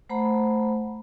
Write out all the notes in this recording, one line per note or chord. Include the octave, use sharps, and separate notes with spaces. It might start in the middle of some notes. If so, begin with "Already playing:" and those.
A3 C5 F#5 A#5 B5